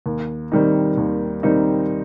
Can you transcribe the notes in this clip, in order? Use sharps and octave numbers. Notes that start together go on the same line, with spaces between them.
D#2
D#3 G3 C4 D#4
D#2
D#3 G3 C4 D#4